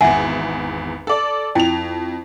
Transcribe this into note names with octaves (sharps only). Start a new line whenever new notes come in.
G#1 E2 E5 F#5 G#5
A4 D5
F2 E4 G5 F7